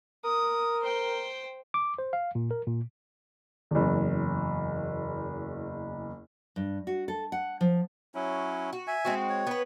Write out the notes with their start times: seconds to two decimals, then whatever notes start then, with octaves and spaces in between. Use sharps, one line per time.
0.24 A#4 D#6
0.82 C5 G5
1.74 D6
1.98 C5
2.13 F5
2.35 A#2
2.51 A#4
2.67 A#2
3.71 F#1 E2
6.56 G2
6.87 F#4
7.08 A4
7.32 F#5
7.61 F3
8.15 F#3 C#4 E4
8.73 F#4
8.87 E5 G#5
9.05 G#3 C4 F#4
9.30 C#5
9.47 B3 B4